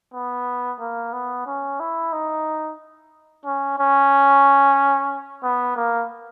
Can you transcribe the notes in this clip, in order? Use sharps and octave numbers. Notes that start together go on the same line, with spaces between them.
B3
A#3
B3
C#4
E4
D#4
C#4
C#4
B3
A#3